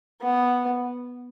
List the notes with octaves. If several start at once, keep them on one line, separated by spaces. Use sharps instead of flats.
B3